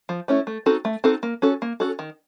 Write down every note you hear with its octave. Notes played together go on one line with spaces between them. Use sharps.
F3
A3 C#4 E4
A3
C4 D#4 F#4 A4
A3
C4 D#4 F#4 A4
A#3
C#4 F#4 A4
A#3
C#4 F#4 A4
D#3